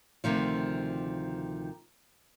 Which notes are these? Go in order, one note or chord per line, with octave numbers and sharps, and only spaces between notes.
D2 C3 D#3 F3